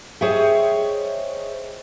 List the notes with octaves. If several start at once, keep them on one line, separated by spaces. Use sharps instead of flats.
G#4 C5 C#5 D#5 E5 G5